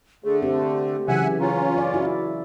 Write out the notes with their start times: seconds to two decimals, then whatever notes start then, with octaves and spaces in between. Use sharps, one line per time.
0.24 D3 A3 G#4
0.42 C4 G4
1.08 C#3 E3 F#3 E5 F#5 G#5
1.40 C#4 F4 A#5
1.78 D5
1.94 E4 F#4